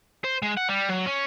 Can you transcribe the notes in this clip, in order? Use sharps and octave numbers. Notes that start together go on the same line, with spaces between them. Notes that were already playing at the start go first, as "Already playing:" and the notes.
C5
G#3
F#5
G3
F#3
C#4